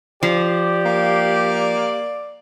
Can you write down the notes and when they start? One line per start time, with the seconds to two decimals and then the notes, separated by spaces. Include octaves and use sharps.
0.23 F3 G4 D5
0.86 A#3